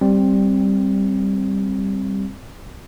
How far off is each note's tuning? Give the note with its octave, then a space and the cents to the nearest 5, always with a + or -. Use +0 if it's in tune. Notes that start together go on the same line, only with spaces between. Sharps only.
G3 +0 C4 +10